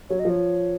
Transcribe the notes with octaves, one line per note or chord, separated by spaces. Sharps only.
F#3 C#5
D#5
F3 C#5